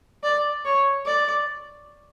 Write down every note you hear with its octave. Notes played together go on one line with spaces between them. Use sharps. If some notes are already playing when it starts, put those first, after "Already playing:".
D5
C#5
D5